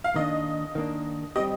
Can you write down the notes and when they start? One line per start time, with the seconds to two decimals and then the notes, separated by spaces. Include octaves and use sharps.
0.04 F5
0.16 D#3 A#3 D4 D#5
0.75 D#3 A#3 D4
1.36 G3 C4 G4 D#5